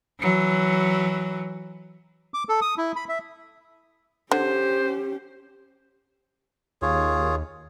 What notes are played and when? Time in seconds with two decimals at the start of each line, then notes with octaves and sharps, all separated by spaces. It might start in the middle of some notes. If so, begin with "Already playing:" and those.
0.20 E3 F#3
2.34 D6
2.49 A4
2.61 D#6
2.78 E4
2.96 B5
3.09 E5
4.32 D3 C#4 G4 C5
6.82 D#2 F4 G#4 C#5